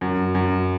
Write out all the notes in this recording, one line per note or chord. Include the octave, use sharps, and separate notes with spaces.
F#2
F#2